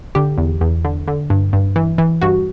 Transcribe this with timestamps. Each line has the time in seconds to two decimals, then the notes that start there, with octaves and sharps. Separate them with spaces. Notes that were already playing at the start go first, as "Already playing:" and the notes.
0.15 D3 G4
0.38 E2
0.61 E2
0.85 D3
1.08 D3
1.30 G2
1.53 G2
1.76 E3
1.98 E3
2.21 G2 F#4